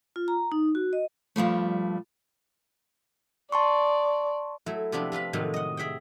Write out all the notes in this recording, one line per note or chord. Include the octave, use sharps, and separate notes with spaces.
F4
A#5
D#4
F#4
D#5
G2 F3 G3 A3
D5 A5 C6 C#6
F#3 A3 E4
C3 F3 B3 D4 E4 G4
C3 F4 B4 B5
A2 C3 D#3 F3 F#3 G#3
D#5 F#5
G#4 E5 F#5 G5